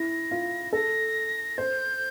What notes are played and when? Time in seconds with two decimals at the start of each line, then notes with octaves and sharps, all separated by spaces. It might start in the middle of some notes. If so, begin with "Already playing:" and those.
Already playing: E4 A#6
0.31 F4
0.73 A4 A#6
1.58 C5 G6